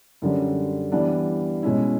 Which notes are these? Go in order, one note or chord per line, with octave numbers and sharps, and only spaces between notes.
F#2 D3 G3
E3 G3 B3 D4
B2 G#3 C#4 E4